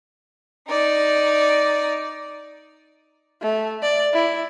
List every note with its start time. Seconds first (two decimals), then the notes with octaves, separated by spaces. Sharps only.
0.68 D#4 D5
3.42 A3
3.82 D5
4.13 E4